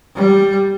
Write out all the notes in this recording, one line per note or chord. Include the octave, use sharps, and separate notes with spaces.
G3